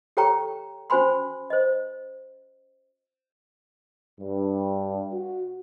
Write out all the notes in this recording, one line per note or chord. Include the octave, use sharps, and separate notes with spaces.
G4 A4 C#5 G5 A#5 C#6
C#4 F#4 C5 G#5 B5 C6
C5 D#5
G2
F#4